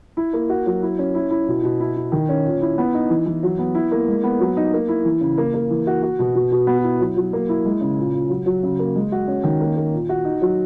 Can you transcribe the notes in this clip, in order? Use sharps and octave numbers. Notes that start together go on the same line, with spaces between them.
E4
A#3
F#4
F#3
E4
C#4
E4
E4
B2
B2
E4
E4
D#3
C#4
A#2
E4
B3
D#4
E3
E3
F#3
B3
E4
A#3
G#3
B3
F#3
D#4
A#3
E4
E3
C#3
A#3
A#3
E3
F#4
F#4
B2
B2
B2
B3
E4
F#3
F#3
A#3
E4
G#3
C#3
A#2
A#2
F#3
F#3
C#3
A#3
G#3
F#4
C#4
D#3
A#3
A#3
A#2
F#4
D#4
F#3